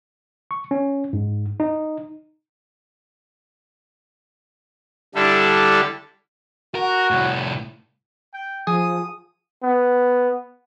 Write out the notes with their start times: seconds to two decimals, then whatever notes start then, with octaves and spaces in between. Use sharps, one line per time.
0.51 C#6
0.71 C#4
1.13 G#2
1.60 D#4
5.15 D3 G3 D4 E4 A4
6.75 F#4 A#4
7.11 C2 A2
8.34 G5
8.67 F3 G#4 D#6
9.63 B3